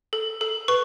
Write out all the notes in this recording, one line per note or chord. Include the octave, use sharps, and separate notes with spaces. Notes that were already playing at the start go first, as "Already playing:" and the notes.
A4
A4
B4 C#6